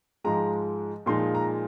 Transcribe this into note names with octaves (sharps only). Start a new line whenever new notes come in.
G#2 F3 G#3 A#5
A#2 F3 G#3 D#4 C6
A#5